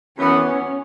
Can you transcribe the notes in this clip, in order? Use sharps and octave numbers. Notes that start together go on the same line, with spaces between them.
F#2 E3 B3 C#4